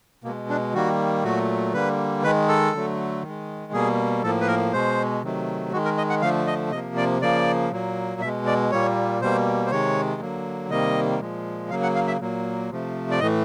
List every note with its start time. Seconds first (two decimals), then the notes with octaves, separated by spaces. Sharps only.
0.24 B2 A#3
0.28 G#3
0.49 D4
0.74 D#3 G3 A#3 F#4
1.24 A#2 F#3 A3 F#4
1.74 D3 G3 A#3 B4
2.23 D#3 G#3 B4
2.48 A4
2.73 D3 F#3 A3
3.23 D#3
3.28 G#3
3.73 B2 G3 A#3 G#4
4.23 A2 F3 A#3 A4
4.41 B4
4.48 A#4
4.73 B2 G#3 C5
5.22 C3 D#3 F#3 A3
5.72 D#3 G#3 F#4
5.85 A#4
5.98 D#5
6.10 F#5
6.22 D3 F3 A3 F5
6.47 D#5
6.72 C3 F3 A#3 D#5
6.97 D5
7.22 C#3 F3 A#3 D5
7.72 A#2 F#3 A#3
8.21 B2 E5
8.26 G#3
8.46 D5
8.71 A#2 G3 A#3 C#5
9.21 B2 G3 A#3 C5
9.66 C5
9.71 C3 D#3 G#3 C#5
10.21 D3 F#3 A#3
10.71 C3 D#3 G3 A#3 D#5
11.20 A#2 F3 G#3
11.70 C#3 F#3 A#3 F5
11.83 F#5
11.95 F5
12.08 E5
12.20 A#2 F#3 A#3
12.70 C3 F3 A3
13.11 D5
13.20 A2 E3 A3 D#5